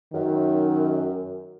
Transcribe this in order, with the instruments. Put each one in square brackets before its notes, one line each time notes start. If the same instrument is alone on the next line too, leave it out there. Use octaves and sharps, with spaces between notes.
[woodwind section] F#2 [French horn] D#3